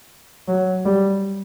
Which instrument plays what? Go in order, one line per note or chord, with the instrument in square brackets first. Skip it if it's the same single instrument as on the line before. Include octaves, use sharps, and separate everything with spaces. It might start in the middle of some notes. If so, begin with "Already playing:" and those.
[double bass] F#3
G3